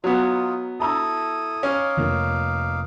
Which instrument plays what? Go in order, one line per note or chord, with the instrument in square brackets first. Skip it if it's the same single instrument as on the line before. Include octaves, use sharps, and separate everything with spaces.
[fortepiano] F#3 B3 [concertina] D#4 F4
[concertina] E4 A4 D#6 [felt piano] A5 A#5 E6
[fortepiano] C#4 [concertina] D#4 F5 D6
[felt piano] F1 A#3